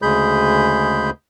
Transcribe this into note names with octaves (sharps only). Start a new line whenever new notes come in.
D2 C#3 G#3 G#4 B5 G6